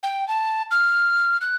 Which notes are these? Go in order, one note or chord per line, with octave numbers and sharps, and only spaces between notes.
G5
A5
F6
F#6